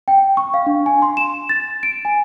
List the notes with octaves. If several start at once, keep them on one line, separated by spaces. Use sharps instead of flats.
G5
C#6
F5
D4
G#5
C6
E7
A6
D7
G#5